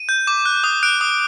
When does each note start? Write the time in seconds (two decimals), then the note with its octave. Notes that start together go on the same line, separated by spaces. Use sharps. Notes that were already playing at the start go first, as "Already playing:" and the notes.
Already playing: D#7
0.09 G6
0.27 D6
0.45 F#6
0.64 D#6
0.83 F#6 D7
1.01 D#6